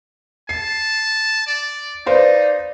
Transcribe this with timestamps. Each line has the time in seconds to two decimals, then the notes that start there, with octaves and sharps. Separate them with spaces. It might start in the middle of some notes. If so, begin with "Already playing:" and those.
0.49 A5 C7
1.47 D5
2.06 D#4 B4 C5 D5 F5